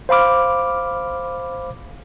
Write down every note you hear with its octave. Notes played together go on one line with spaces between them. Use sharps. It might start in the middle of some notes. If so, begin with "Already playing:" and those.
C5 F5 B5 D6 F6